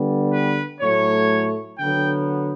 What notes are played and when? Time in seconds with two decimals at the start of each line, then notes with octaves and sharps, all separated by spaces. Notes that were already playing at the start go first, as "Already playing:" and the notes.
Already playing: D3 G3 B3
0.32 B4
0.81 A2 F#3 A3 C#5
1.79 D3 F#3 B3 G5